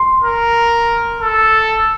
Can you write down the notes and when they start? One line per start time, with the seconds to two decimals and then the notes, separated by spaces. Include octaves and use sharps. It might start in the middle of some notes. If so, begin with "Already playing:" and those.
Already playing: C6
0.23 A#4
1.21 A4